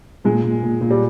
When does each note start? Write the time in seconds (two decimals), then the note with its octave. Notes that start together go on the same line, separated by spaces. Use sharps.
0.24 A#2 G#3
0.44 A#2
0.63 A#2
0.81 A#2
0.91 G3